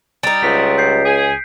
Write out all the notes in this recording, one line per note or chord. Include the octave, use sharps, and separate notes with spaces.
G3 D#4 D7
C#2 F3 F#3 C4 B6
G6 C7
G#4